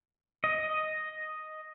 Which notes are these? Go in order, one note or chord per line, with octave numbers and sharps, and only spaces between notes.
D#5